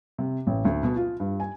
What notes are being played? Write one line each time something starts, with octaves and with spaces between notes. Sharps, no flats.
C3
A1
D2
B2
F4
G2
G#5